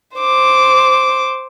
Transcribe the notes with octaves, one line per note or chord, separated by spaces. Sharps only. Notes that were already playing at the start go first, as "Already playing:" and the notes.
C5 D6